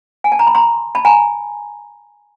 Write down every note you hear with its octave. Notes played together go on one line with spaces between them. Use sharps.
G#5
A5
A#5
B5
A#5 C6
A5 B5
G#5 A#5